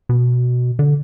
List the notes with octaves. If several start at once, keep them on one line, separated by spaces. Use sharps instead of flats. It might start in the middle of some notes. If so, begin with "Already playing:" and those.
B2
D3